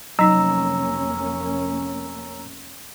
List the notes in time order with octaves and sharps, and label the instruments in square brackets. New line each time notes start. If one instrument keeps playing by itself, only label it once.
[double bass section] F1 A#3 C#4 [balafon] F#3 D#4 [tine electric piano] A#5 E6